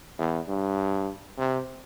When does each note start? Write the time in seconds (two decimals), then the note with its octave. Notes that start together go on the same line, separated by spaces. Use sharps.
0.19 E2
0.48 G2
1.38 C3